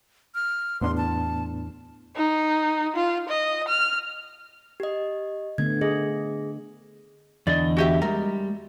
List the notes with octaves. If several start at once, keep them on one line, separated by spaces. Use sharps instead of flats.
F6
E2 A2 B3 D4 C6
A5
D#4
F4
D#5
F6
G4 D#5
D3 A3 B3 G#6
G#4 D#5
E2 D3 D5 D#5
F#4 G4 E5
G3 G#3 A#4